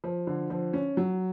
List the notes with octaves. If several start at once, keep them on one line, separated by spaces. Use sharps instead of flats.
F3
D3
F3
C#4
F#3